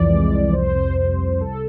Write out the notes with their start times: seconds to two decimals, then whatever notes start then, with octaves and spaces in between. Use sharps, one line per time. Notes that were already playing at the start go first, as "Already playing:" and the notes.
Already playing: C2 F2 E3 D5
0.09 G#3
0.31 F2
0.53 C2 C5
0.75 C3 C5
0.97 C2
1.18 C2
1.40 C2 A4